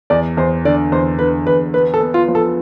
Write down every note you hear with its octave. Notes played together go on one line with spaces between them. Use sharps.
E2 D5
E2 C5
D3 D5
E2 C5
D3 B4
E2 B4
B3 B4
A4
B3
F4
F3
A4